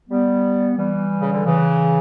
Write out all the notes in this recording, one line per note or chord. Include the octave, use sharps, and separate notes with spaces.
G3 B3
E3 G3
C#3
D3
C#3 E3